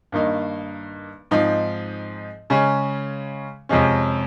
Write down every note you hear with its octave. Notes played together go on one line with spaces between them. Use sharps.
G2 D#3 A#3 D#4
G#2 F3 C4 D#4
C#3 G#3 C#4
F2 C3 F3 G#3 C#4